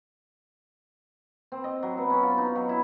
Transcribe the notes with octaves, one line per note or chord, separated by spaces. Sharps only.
C4
D#5
F#3
B3
C#4
F4
D#4
F#3
E4